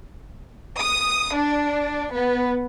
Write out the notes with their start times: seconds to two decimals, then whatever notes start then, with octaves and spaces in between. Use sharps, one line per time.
0.79 D#6
1.38 D4
2.12 B3